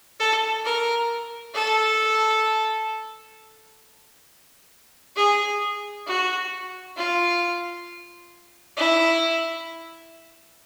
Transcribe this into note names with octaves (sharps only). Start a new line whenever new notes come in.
A4
A#4
A4
G#4
F#4
F4
E4